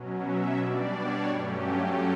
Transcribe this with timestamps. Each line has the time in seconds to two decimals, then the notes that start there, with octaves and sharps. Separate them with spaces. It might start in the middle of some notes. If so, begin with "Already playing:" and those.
Already playing: B2 F#3 C#4
0.22 E5
0.57 B2 G3 D4 D5
0.93 C#5
1.28 G2 F#3 A3 C#4 G4